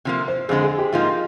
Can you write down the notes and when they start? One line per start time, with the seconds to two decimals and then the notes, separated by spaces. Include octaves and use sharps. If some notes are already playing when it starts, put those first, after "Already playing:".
0.05 C3 F3 A#3
0.28 C5
0.49 F2 D3 G#3 G#4
0.63 G#4
0.78 G4
0.93 G#2 F3 A#3 D#4 F4